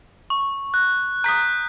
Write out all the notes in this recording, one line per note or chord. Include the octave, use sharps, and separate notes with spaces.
C#6
F#6
A#5 D#6 G6 B6